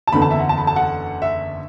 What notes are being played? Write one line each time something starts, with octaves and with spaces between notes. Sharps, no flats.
A5
F#1 E2 D3 B5
A5
E5
F#5
A5
B5
A5
F#5
E5